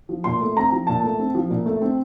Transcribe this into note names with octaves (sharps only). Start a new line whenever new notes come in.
F3
A#2 C6
A3
C4 A#5
F3
A#2 A5
A3
C4
F3
A#2
A3
C4